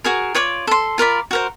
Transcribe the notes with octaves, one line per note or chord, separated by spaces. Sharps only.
F#4 G#4 A#4
F4 C#5 D5 D6
A4 C6
F4 A#4 D5 B5
F#4 A#4 C5